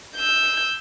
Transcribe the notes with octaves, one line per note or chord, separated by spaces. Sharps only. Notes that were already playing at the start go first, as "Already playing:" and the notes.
E6 G6